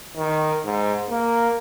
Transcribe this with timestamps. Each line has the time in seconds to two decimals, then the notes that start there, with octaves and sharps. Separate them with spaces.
0.17 D#3
0.65 G#2
1.10 A#3